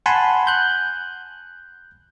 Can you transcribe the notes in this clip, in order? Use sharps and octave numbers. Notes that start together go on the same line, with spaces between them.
F#5 G#5 A5 B5 C6
F#6 G6